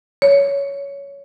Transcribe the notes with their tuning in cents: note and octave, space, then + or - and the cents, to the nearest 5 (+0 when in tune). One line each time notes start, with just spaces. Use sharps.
C#5 +15